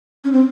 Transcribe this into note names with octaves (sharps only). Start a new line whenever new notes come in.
C#4
C4